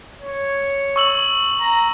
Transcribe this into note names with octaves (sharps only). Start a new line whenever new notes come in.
C#5
C#6 E6 F#7
A#5